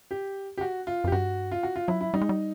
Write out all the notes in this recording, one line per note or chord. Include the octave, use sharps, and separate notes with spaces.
G4
G4
F#4
F4
F#2 G4
G2 F#4
F4
F#4
F4
F#3 E4
E4
G3 D#4
G#3
G3